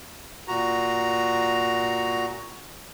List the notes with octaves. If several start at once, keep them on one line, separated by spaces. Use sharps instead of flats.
A#2 F#4 A#5